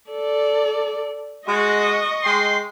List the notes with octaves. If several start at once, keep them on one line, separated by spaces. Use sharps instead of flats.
A4 D5
G#3 F#4 D#5 C#6
G#3 G5 C6